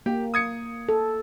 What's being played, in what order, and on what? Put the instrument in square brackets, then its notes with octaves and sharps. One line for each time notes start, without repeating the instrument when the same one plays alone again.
[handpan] A#3 [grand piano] G4
[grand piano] D#6 G#6 C#7
[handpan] A4